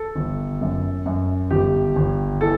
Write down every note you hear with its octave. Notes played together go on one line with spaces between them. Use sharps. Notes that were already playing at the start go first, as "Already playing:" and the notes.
Already playing: A4
G1
F#2
F#2
G1 G4
G1
E3 A4